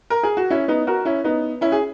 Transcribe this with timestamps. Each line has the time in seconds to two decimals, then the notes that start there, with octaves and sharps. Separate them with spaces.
0.10 A#4
0.23 G#4
0.37 F#4
0.50 C#4 E4
0.68 B3 D#4
0.87 F#4 A#4
1.05 C#4 E4
1.24 B3 D#4
1.61 C#4 E4
1.72 G#4